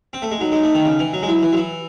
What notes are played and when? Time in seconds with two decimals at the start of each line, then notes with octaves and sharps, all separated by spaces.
0.13 C4
0.22 A3
0.31 G#3
0.41 F#3 D#4
0.52 G#3
0.63 A3
0.75 D#3
0.85 C#3
0.99 E3
1.13 F#3
1.22 G#3
1.28 F#3 E4
1.43 E3
1.52 F#3
1.57 E3